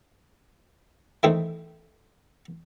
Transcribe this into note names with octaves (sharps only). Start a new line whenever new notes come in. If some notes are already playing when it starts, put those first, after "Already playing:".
D#3 E3 A3 C4 D#4